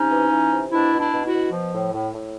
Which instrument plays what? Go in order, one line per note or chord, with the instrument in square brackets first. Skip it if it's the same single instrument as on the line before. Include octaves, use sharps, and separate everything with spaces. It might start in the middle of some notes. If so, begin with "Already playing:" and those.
Already playing: [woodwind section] C3 C#4 D#4
E3
E3
C3
B2 D4 E4
B2
D4 E4
B2
E4 F#4
B2
F3
A2
A2
A2